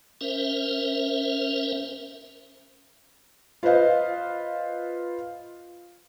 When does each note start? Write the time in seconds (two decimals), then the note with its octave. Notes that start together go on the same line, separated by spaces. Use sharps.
0.21 C#4 A#4 C5 E5
3.63 F4 B4 C5 D#5 F5